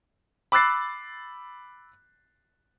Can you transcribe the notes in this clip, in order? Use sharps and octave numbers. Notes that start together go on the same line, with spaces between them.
B5 D6 E6 F#6 A6 C7